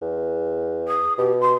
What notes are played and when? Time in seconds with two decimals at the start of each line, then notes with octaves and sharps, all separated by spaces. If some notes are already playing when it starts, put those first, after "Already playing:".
0.02 E2
0.88 D#6
1.18 B2 G4
1.41 C6